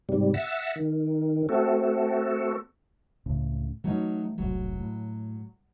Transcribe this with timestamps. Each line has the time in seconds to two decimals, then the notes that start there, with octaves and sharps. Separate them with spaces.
0.09 G#2 C3 G3
0.34 E5 F#5 E6 A6 A#6
0.76 D#3
1.49 A3 C4 F#4 A4
3.26 C#2 A2 C#3
3.84 E3 F#3 A3 C#4 D#4
4.38 E1 C2 A2 F#3
4.79 A2